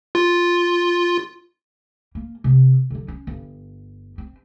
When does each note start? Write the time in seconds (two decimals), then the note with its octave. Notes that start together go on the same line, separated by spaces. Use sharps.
0.15 F4
2.15 A#3
2.44 C3
2.90 D3 F#3
3.08 C#4
3.27 G1
4.18 C4